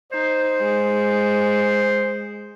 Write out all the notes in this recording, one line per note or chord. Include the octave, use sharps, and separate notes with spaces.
D#4 C5
G#3